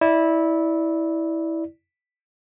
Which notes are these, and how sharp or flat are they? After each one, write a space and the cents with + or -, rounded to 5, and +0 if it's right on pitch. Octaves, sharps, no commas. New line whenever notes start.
E4 -15 D5 +0